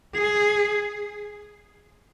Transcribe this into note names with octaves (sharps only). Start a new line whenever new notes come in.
G#4